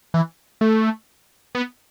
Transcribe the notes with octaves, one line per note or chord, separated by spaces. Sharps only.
E3
A3
B3